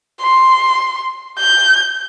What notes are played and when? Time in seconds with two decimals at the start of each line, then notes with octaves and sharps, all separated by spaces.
0.22 C6
1.39 G6